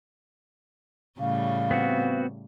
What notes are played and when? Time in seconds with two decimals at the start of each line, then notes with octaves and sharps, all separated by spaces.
1.20 A2 C#3 G3 F5
1.71 B3 C4 F#4